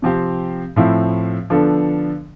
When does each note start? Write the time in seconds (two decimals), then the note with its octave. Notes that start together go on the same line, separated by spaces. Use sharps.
0.02 C3 F3 C4 G4
0.76 A2 F3 C4 E4
1.50 D3 F3 B3 D4 A4